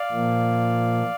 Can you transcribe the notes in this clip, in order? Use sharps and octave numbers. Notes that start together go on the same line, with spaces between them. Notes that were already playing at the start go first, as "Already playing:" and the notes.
Already playing: D5 F5
A#2 F3 A#3